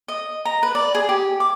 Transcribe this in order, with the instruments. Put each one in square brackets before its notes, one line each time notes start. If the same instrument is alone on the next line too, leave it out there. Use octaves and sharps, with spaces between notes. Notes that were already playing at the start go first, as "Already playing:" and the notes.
[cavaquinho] D#5
A#5
B4
D5
G#4
G4
D6